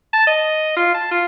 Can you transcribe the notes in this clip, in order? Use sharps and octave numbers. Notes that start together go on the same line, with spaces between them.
A5
D#5
F4
A5
F4